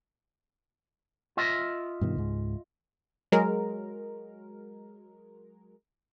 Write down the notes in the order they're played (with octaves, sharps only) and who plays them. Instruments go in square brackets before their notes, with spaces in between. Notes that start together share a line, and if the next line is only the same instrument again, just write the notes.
[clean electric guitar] F4 D#5 E5
[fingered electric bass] G2 B2 D#3
C#2 G#2
[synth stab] F#3 G#3 A#4